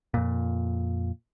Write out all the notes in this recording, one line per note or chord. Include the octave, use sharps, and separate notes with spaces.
F2 A#2